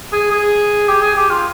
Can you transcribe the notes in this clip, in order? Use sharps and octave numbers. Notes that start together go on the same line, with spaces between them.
G#4
G#4
G4
G#4
G4
F4